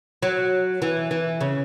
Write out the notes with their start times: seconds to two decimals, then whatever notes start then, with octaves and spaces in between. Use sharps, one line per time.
0.23 F#3
0.82 E3
1.11 E3
1.41 C#3